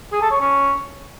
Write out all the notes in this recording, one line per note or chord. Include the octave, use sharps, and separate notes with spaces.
G#4
A4
C#5
C#4